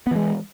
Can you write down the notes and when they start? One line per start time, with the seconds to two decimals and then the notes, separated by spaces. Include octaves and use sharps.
0.07 B3
0.11 E3
0.16 G#3